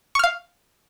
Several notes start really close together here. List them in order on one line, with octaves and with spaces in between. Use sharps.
C#6 F6 F5